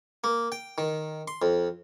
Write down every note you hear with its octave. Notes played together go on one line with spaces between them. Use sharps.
A#3
G5
D#3
C6
F2